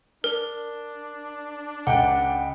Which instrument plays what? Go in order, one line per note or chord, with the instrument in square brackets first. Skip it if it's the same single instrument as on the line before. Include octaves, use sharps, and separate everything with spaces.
[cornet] D4 [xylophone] A#4
[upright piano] C#2 G5 [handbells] F#5